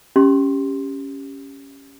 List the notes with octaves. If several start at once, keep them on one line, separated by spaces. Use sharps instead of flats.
C#4 G4 C6